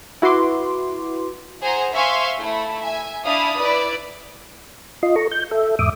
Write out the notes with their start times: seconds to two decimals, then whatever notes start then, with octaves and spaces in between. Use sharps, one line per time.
0.22 E4 F#4 B4 C6 D6
1.62 G#4 C5 F#5 G#5 A#5
1.93 C5 E5 F5 G#5 C6 C#6
2.39 A3 E4
2.81 E5 G#5
3.25 D4 E4 F5 D#6
3.59 E4 B4 D5
5.03 F4 D#5 C6
5.16 A4 A#5 C#6
5.31 G6
5.51 A4 E5
5.79 E2 G#2 E5 D6 D#6